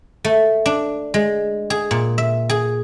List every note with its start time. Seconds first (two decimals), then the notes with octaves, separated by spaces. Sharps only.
0.25 A3
0.66 D4
1.14 G#3
1.70 G#4
1.91 A#2
2.18 E5
2.49 G#4